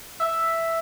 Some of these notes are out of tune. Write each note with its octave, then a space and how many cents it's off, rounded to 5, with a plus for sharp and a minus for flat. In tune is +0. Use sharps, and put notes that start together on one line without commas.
E5 +0